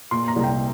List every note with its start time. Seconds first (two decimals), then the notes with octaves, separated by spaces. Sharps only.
0.11 A#2 C6
0.28 A#5
0.36 C2
0.44 G5